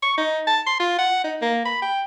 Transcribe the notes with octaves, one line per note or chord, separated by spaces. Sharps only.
C#6
D#4
A5
C6
F4
F#5
D#4
A#3
B5
G5